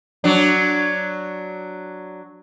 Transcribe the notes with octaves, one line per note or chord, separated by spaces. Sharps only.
F#3 D4